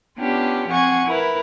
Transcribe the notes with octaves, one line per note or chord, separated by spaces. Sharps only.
B3 C#4 D4 F4 G4
F3 C4 F#5 G#5 C#6 G#6
E4 A#4 B4